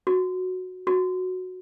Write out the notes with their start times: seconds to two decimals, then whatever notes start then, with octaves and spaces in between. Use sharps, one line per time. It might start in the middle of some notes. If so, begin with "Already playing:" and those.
0.07 F#4
0.87 F#4